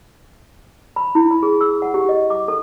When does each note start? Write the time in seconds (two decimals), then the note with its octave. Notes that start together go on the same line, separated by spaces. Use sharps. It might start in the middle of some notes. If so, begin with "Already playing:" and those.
0.96 B5
1.15 E4
1.31 B5
1.43 G#4
1.61 E6
1.82 F#5
1.94 G4
2.09 D#5
2.30 D6
2.48 A4